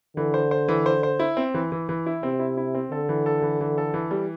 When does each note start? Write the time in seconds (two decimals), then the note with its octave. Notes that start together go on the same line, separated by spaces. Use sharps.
0.17 D3 E3
0.34 C5
0.51 C5
0.68 E3
0.86 C5
1.03 C5
1.19 E4
1.37 C4
1.54 E3
1.72 E3
1.89 E3
2.06 E4
2.23 C3 C4
2.39 E4
2.57 E4
2.75 C4
2.91 D3 A4
3.09 E3
3.26 A4
3.42 E3
3.61 E3
3.78 A4
3.94 E3
4.11 G3